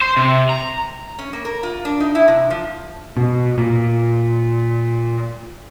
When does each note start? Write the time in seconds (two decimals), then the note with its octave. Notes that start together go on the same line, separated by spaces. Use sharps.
0.01 C5
0.17 C3
0.49 A#5
1.19 C#4
1.33 A#3
1.45 A#4
1.63 F4
1.85 D4
2.00 D#4
2.15 E4
2.28 C3
2.50 F3
3.17 B2
3.58 A#2